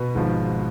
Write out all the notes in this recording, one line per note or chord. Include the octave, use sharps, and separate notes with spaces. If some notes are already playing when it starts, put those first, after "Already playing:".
Already playing: B2 B3
G#1 G#2 F3